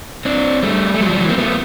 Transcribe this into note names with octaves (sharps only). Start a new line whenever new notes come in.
C4 D4
G3 A3
A3
F#3 G#3
F3 G3
E3 F#3
A#3 C4
A3 B3